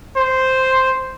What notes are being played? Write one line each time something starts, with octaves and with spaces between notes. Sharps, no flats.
C5